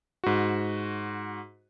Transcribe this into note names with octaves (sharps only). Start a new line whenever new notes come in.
G#2 F#4